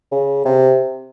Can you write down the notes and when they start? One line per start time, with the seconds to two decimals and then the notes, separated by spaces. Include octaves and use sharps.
0.12 C#3
0.45 C3